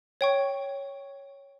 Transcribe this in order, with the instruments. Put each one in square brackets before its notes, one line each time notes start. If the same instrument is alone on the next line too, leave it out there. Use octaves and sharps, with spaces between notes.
[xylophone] C#5 G5 C#6